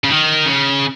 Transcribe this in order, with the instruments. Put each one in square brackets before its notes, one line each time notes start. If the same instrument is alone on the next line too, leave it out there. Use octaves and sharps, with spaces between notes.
[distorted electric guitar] C#3
D#3
C#3